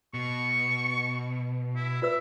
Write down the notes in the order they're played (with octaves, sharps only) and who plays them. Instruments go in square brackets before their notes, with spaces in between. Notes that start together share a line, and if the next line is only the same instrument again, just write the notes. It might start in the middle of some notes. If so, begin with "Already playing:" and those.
[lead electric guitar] B2 [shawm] C#6
[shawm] E4
[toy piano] F4 B4 E6 [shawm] E5